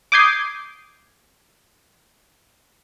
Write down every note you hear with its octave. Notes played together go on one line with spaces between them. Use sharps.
D6 D#6 G6 G#6 C7